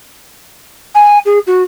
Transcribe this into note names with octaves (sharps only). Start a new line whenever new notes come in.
G#5
G#4
F#4